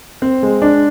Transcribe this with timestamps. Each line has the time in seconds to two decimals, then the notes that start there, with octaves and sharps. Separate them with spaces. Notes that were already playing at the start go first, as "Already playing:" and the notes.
0.22 C4
0.43 G#3
0.62 D4